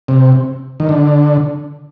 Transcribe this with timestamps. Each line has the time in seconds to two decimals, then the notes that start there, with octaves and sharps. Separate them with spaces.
0.08 C3
0.80 D#3
0.89 D3